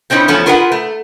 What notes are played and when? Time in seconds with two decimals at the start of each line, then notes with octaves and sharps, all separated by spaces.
0.10 A3 C4 C#4 D#4 E4 B4
0.28 E2 F3 A3 B3 C#4 A4
0.46 F4 G#4 A#4 B4 E5 F#5
0.72 A3